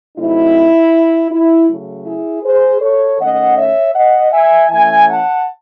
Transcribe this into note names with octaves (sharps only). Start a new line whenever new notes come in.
C3 F#3 A3 C4 D#4 E4
E4
C#3 F#3 A3
E4 G#4
G#4 C5
A4 C#5
D#3 A3 C#4 D#5 F#5
C#5 E5
D#5 F#5
E5 G#5
E3 A3 C#4 E5 G#5
F#5 A5